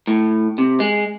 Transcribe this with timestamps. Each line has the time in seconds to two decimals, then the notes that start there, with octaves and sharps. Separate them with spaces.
0.07 A2
0.58 C3
0.80 G#3